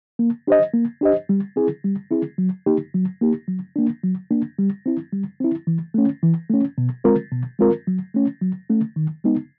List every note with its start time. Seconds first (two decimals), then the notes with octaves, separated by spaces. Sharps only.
0.19 A#3
0.47 D4 G4 C5 D#5
0.74 A#3
1.01 D4 G4 C5 D#5
1.29 G3
1.56 C4 E4 G#4
1.85 G3
2.11 C4 E4 G#4
2.38 F#3
2.66 A#3 D#4 G4
2.94 F#3
3.22 A#3 D#4 G4
3.48 F#3
3.76 A#3 D4
4.04 F#3
4.31 A#3 D4
4.59 G3
4.86 C4 E4
5.12 G3
5.40 C4 E4
5.67 E3
5.94 A3 C#4
6.23 E3
6.49 A3 C#4
6.78 B2
7.04 G#3 C4 F4 A#4
7.32 B2
7.59 G#3 C4 F4 A#4
7.87 F#3
8.14 A3 C#4
8.41 F#3
8.70 A3 C#4
8.96 D#3
9.24 G#3 B3 D#4